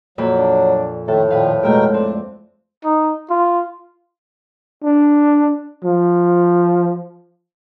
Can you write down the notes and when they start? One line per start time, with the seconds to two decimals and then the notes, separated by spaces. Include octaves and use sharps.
0.18 F2 A#2 F#3 B5
0.39 D4
1.08 A2 D#3 A3 A4
1.30 A#2 D#3 F3 B4 F5
1.63 B2 G#3 A3 A#4 G5
1.94 C4 D4
2.85 D#4
3.30 F4
4.84 D4
5.85 F3